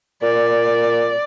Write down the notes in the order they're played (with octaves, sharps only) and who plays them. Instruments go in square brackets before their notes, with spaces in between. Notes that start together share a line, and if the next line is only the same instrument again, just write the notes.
[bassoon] A#2 [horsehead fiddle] D5